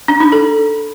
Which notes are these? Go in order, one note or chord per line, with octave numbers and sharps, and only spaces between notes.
D4
D#4
A4